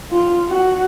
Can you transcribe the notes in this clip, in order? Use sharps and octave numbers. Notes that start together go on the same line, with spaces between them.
F4
F#4